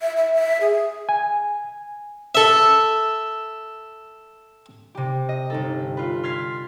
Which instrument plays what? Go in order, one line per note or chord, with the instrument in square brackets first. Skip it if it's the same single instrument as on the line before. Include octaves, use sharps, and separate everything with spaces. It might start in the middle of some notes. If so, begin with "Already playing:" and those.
[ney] E5
E5
E5
G#4
[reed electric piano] G#5
[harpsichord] A4 E5
[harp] C3 G4
D#5
G1 D#4 A4
F4 B4
C6 F6 G#6 A6 B6 C7